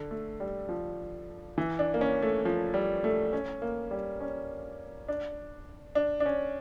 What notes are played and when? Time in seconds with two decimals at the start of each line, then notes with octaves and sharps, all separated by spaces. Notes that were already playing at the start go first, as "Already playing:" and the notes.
Already playing: D3
0.11 A3
0.40 G3
0.69 F3
1.58 E3
1.79 D4
1.94 A#3
2.01 C#4
2.22 A3
2.45 F3
2.74 G3
3.04 A3
3.33 C#4
3.62 A#3
3.91 G3
4.20 C#4
5.08 D4
5.95 D4
6.20 D4
6.26 C#4